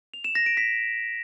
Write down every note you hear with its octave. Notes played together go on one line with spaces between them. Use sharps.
F7
E7
A#6
D7
B6